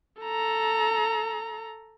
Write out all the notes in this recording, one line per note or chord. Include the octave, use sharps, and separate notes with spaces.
A4 A#5